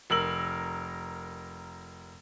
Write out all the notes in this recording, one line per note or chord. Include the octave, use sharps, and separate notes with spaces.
F1 A#4 E6 F#7